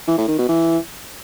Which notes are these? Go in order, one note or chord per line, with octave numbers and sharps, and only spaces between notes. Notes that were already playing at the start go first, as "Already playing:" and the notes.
E3
A2
D#3
B2
E3